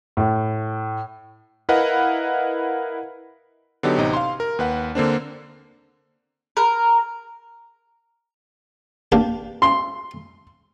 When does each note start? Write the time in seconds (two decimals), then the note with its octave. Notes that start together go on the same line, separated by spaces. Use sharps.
0.17 A2
1.69 E4 A#4 B4 D#5 F5 F#5
3.83 D3 F#3 B3 D#4 G4
3.98 A1 C3 D#4
4.14 F5 C6
4.40 A#4
4.59 D#2 B4 F#5
4.95 D3 A#3 C4 D4
6.57 A#4
9.12 A#3 D4 G4
9.62 C6